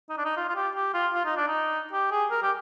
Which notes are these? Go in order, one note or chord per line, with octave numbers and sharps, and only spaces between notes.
D#4
D4
D#4
F4
F4
G4
G4
F4
F4
D#4
D4
D#4
G4
G#4
A#4
G4